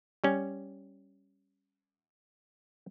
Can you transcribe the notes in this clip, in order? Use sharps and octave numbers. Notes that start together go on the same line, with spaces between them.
G3 C#4